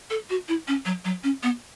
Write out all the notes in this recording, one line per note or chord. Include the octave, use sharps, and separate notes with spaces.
A4
F#4
E4
C#4
F#3
F#3
C#4
B3